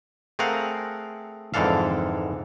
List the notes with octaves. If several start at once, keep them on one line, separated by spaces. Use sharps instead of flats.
A3 C4 G#4 A#4 F5 F#5
F2 G#2 D3 E3 A4 F5